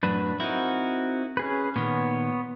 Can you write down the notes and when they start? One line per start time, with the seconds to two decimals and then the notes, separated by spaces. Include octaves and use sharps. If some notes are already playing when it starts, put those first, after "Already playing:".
0.03 F#2 A2 F#3 D4 B4
0.40 C4 D#4 E4 F#4 A#4
1.37 C#4 G#4 B4
1.76 A#2 D#3 B3 C#5